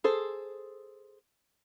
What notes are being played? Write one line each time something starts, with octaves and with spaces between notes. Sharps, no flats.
G#4 A4 C5